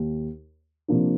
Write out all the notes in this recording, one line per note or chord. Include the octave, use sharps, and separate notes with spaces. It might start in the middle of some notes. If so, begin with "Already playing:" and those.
Already playing: D#2
C3 F3 A#3 D4